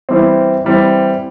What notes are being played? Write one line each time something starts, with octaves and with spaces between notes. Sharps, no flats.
E3 G3 C4
E3 G3 C4